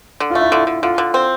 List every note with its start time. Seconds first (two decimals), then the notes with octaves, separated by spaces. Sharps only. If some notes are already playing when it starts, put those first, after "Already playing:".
0.20 D3
0.30 A3 F4
0.41 E4
0.51 D3 E4
0.67 D3
0.83 D3 F4
0.98 D3
1.14 C4